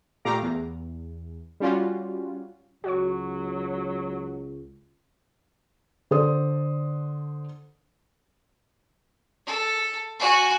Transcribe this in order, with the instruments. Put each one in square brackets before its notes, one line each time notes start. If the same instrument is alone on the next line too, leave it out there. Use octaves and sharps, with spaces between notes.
[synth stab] A#2 A3 G4 F5 A#5 D6
E2
G3 C#4 F4 F#4
[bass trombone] C#2 [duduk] F#3 [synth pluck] F#4 C#5 C#6
[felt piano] D3 A4 C5 D5 D#6
[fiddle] A4
F#4 G#5